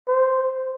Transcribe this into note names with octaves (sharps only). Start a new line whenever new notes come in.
C5